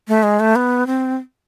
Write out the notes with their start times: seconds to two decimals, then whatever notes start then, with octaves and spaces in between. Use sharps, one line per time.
0.08 A3
0.23 G#3
0.40 A3
0.56 B3
0.87 C4